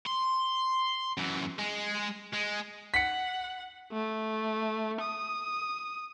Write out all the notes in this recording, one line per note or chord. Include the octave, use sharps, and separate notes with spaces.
C6
F#2 E3
G#3
G#3
F#5 B6 C#7
A3
D#6